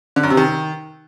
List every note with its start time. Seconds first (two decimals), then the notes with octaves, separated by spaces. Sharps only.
0.16 D3
0.23 F#2
0.30 C3
0.37 D#3